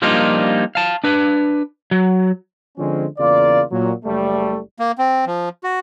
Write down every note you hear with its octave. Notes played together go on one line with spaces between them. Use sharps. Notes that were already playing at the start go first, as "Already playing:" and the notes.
F3 G3 A#3 D4 D#4 F4
F5 A5
D4 B4
F#3
D3 F3 G#3 C4 C#4
E2 C#3 A#3 F4 D5
A#2 F#3
F#1 G3 A3
A#3
C4
F3
F#4